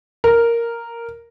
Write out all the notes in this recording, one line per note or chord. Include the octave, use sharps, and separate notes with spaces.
A#4